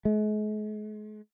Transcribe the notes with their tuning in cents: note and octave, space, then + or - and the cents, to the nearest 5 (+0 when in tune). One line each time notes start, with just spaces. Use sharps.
G#3 +40